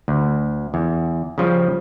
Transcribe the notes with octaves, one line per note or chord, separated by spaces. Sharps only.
D2
E2
C#3 F3 G3